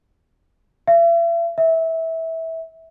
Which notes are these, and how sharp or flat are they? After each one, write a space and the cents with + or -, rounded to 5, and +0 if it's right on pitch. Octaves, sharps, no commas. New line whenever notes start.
E5 +40
E5 -20